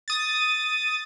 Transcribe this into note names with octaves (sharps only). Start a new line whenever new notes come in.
D#6 A6